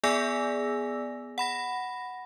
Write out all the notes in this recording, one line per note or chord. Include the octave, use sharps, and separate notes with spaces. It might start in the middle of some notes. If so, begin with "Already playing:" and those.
B3 G#4 D5 G#5 E6 A#6
F#5 B5 A#6